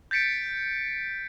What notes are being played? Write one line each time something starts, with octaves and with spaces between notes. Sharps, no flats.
G6 A6 B6 C#7 D7